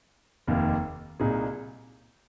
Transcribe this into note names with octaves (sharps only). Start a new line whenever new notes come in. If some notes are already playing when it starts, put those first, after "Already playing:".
F1 D#2 D#3 A#3
C2 A#2 A#3 D#4 G#4